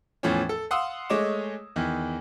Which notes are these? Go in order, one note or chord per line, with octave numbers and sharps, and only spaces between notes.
E2 A2 E3 F3 C#4
A4
F5 F#5 C6 D#6 E6
G#3 A3 C#5 D#5 D6 E7
E2 D#3 E3